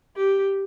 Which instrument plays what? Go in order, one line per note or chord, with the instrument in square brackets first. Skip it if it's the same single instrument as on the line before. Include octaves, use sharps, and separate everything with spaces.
[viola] G4